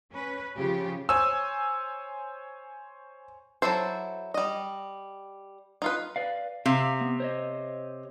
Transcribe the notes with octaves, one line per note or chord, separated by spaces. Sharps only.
C#4 B4
C#3 F3 F4 G4
C5 C#5 G#5 E6
F#3 C#4 E4 A4 C5
G3 D#5
D#4 F4 B4
B4 D5 F5
C3 F5
B3
C5 C#5 D#5